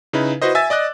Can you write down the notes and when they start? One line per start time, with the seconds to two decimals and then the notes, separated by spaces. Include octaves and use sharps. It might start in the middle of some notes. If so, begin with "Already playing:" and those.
0.13 C#3 D#4 E4 B4
0.42 E4 F#4 B4 C5 D#5
0.55 E5 G#5 E6 A6
0.70 D5 D#5 D6 F#6